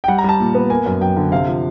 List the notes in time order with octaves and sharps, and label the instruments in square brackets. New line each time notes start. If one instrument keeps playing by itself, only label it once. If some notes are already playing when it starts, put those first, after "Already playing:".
[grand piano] G5
G3 F#5
A#5
G3 A5
A#2
B3
A#3 G#5
F#2
F#2 G5
D3
C3 F5
F3